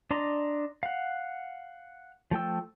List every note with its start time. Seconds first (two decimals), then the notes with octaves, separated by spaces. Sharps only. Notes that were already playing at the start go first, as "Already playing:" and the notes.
0.11 D4 D5 D#5 A#5 C6
0.83 F5 F#5
2.31 F3 A3 G5 E6